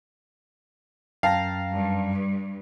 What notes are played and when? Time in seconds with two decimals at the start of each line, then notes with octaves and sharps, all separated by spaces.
1.23 F#2 F5 G5 A5 A#5 A#6
1.72 G2